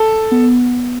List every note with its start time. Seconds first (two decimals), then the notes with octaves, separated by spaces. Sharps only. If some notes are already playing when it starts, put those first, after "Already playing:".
Already playing: A4
0.31 B3